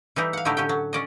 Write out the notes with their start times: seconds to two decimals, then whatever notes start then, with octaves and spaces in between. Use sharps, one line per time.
0.16 E3 G3 D#4 E4
0.33 F5 F#5
0.45 A2 D3 F#3 D#4 E4 G4
0.57 D3 C#4 G4 G5
0.69 F#3
0.93 C#4 D5 D#5